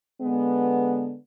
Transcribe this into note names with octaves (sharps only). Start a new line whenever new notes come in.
D3 G#3 B3